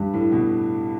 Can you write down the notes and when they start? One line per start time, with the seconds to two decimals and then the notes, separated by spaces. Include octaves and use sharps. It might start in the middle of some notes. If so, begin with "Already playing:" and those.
Already playing: G2 G3
0.14 A2
0.32 B2